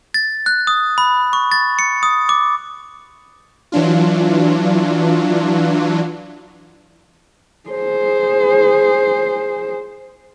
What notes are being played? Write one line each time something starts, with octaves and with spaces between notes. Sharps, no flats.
A6
F#6
D#6
B5
C#6
A6
C#7
D#6
D6
E3 F#3 D4 F4
G#4 C5